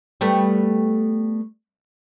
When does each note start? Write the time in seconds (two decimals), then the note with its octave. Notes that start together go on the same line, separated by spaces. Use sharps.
0.21 G3 A3 B3